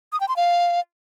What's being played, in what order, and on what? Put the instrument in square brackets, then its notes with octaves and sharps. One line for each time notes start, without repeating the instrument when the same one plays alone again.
[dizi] D#6
G5
C6
F5